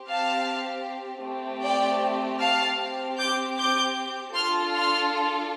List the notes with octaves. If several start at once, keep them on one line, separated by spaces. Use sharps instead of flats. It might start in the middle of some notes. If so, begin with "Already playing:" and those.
Already playing: C4 G4
F5 A5
A3 C4 G4
D5 G5
F5 A5
C4 G4
D6 G6
D6 G6
D4 F4 A4 C6 F6
C6 F6